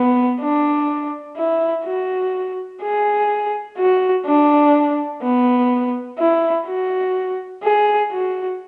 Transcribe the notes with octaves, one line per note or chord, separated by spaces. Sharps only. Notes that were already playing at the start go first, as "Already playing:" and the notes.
Already playing: B3
D4
E4
F#4
G#4
F#4
D4
B3
E4
F#4
G#4
F#4